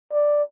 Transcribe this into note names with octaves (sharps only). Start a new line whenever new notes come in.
D5